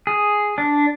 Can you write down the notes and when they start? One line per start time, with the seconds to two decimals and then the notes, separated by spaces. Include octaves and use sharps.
0.07 G#4
0.58 D4